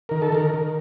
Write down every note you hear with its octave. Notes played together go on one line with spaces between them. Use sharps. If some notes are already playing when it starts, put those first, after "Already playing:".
D#3 A#4
A4
D#3 A#4
D#3